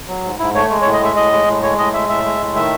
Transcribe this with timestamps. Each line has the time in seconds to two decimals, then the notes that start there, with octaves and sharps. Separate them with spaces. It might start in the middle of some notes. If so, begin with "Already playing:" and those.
0.08 F#3
0.24 G#2
0.39 G#2 E4
0.55 A3 C#5
0.70 G#3
0.82 C#5
0.85 A2
0.93 D#5
1.01 G#3 E5
1.16 A2 D#5
1.32 G#3
1.47 A2
1.63 G#3 C#5
1.78 A2 D#5
1.93 G#3 E5
2.09 A2 E5
2.24 G#3
2.40 A2
2.55 D#3 E5